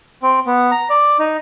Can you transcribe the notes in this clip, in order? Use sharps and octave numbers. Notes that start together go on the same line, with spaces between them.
C4
B3
A#5
D5
D#4